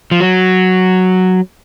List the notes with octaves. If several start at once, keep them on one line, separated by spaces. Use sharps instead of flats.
F3
F#3